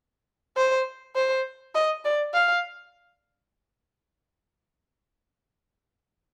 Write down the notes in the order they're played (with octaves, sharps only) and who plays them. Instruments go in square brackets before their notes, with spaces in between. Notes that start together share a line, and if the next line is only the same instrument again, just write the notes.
[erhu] C5
C5
D#5
D5
F5